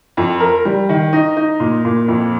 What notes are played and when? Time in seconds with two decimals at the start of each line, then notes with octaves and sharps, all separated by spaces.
0.17 F2
0.40 A#4
0.65 G3
0.89 D#3
1.13 D#4
1.37 D#4
1.60 A#2
1.85 A#2
2.08 F2